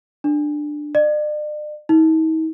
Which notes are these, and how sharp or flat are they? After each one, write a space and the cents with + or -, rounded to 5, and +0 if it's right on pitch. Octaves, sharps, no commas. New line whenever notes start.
D4 +15
D5 +40
D#4 +45